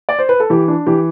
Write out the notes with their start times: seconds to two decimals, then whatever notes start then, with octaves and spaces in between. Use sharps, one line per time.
0.09 D5
0.19 C5
0.29 B4
0.40 A4
0.50 E3 G4
0.68 D4
0.86 E3 G4